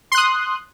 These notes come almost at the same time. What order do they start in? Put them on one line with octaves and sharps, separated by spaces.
C6 F#6 D#6